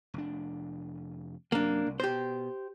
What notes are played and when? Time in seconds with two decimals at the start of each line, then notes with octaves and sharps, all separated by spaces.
0.14 F1 D4
1.52 F#2 C3 F#3 A#3 D4
1.86 C2
2.00 B2 G4 C5